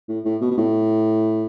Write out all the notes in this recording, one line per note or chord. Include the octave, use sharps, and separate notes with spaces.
A2
A2
B2
B2
A2